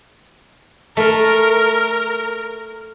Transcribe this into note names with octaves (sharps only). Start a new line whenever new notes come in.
A3 A#4